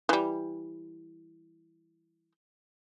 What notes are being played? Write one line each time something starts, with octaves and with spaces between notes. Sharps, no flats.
E3 G3